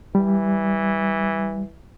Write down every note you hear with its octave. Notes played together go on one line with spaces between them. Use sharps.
E3 G3